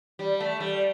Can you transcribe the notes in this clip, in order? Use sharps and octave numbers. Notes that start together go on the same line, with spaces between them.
G3
A3
G3